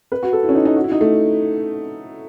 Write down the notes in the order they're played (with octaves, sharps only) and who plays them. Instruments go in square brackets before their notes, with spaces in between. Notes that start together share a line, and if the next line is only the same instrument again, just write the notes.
[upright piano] B4
F#4
A4
E4
C#4
D#4
D#4
F#4
E4
D#4
A3